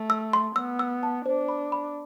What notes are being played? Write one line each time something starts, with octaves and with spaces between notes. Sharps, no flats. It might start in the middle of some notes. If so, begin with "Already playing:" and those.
Already playing: A3
E6
C6
B3 E6
E6
A5
D4 C5
B5
B5